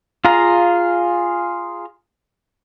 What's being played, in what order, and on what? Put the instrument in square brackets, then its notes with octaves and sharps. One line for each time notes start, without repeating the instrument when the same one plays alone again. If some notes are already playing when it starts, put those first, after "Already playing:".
[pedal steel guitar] F4 G#4 F5 A#5